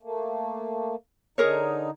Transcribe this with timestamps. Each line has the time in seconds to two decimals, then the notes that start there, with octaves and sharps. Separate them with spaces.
0.03 A3 A#3
1.38 D3 D#4 G#4 A#4 C#5